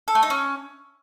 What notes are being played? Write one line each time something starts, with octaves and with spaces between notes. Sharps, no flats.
A4
A3
D#4
C#4